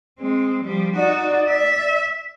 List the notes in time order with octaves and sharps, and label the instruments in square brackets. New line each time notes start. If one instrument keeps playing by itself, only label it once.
[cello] G#3 C4
F3 G3
[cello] D#4 F#4 [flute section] D5
[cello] E5